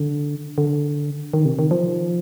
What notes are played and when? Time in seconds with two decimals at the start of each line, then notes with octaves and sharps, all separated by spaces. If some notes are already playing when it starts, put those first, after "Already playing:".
Already playing: D3
0.58 D3
1.34 D#3
1.45 C3
1.59 D#3
1.71 F3